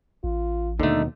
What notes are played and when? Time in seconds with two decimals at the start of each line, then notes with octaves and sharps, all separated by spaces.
0.24 A1 F4
0.80 D#2 B2 D3 A3 D#4